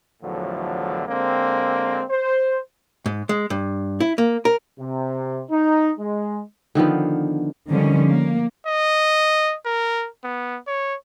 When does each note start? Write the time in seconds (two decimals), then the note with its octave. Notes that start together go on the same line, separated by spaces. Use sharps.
0.23 E2 A2 D3 F3 F#3
1.08 D3 G#3 A#3 C4
2.10 C5
3.06 G#2
3.29 G#3
3.50 G2
4.00 E4
4.18 A#3
4.45 A#4
4.79 C3
5.51 D#4
5.99 G#3
6.75 D3 D#3 F3 B3
7.70 D3 D#3 F3 G3 C#4
8.11 A#3
8.67 D#5
9.66 A#4
10.24 B3
10.67 C#5